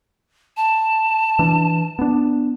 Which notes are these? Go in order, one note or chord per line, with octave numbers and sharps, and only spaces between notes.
A5
E3 D4
B3 D4